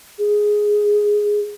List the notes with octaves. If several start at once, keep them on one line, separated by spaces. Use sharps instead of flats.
G#4